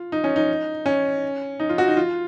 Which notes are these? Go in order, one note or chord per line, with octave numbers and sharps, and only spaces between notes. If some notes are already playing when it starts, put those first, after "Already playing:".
Already playing: F4
D#4
C#4
D#4
C#4
D#4
F4
F#4
D#4
F4